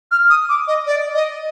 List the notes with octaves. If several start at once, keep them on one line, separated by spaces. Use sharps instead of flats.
F6
D#6
D6
D#5
D5
D#5